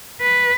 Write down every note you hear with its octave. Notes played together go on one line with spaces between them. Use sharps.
B4